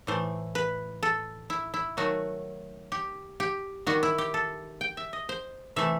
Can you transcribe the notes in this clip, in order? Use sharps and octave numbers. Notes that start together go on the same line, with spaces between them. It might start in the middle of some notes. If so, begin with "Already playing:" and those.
A2 E3 A3 C5
B4
A4
E4
E4
D#3 F#3 A3 F#4
G4
G4
D#3 G3 F#4
E4
G4
A4
G5
E5
D#5
C5
C3 E3 A3 E5